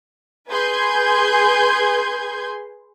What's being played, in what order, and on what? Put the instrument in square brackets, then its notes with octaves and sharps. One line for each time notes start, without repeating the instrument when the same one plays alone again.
[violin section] G#4 B4 C6 G6 G#6